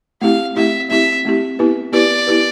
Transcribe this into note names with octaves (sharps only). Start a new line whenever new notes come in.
A3 C4 E4 G4 F5
A3 C4 E4 G4 E5
A3 C4 E4 G4 E5
A3 C4 E4 G4
B3 E4 G4 B4
B3 E4 G4 B4 D5
B3 E4 G4 B4